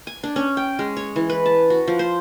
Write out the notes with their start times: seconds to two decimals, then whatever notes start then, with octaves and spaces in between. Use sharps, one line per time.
0.07 G#5
0.23 D4
0.36 C#4
0.57 G5
0.79 G#3
0.97 C#5
1.16 E3
1.30 B4
1.46 A5
1.70 F#4
1.88 F3
1.99 C5